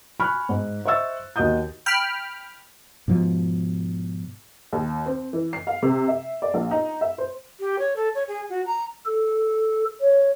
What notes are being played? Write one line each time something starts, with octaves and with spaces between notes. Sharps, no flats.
G#5 B5 C#6 F6 F#6
G#2
C5 D#5 E5 C#6 E6 A6
D#2 F#4 D#5 D#6 G6
G5 B5 F6
G#2 B2 F3
D#2
C4
E3
C7
F5
C3
E5
D5
A#1
D#4
E5
C5
G4
C#5
A4
C#5
G#4
F#4
A#5
A4
C#5